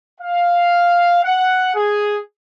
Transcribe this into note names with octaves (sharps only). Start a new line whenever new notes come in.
F5
F#5
G#4